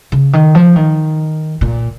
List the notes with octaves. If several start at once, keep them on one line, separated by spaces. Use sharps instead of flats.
C#3
D#3
F3
D#3
A#2